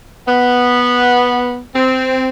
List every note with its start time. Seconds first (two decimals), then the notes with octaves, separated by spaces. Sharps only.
0.27 B3
1.74 C4